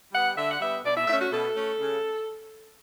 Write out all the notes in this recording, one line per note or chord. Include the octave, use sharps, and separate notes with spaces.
G3 B3 F#5
D3 E5
F#5
G3 B3 E5
B2 D5
E5
A3 C#4 E5
F#4
B2 A4
A3 C#4
C#3